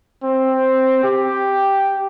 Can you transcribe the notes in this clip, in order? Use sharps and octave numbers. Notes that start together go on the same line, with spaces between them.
C4
G4